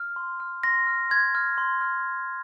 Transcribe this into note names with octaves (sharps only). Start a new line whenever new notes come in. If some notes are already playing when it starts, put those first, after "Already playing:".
Already playing: F6
C6
F6
C6 A#6
F6
C6 G#6
F6
C6
F6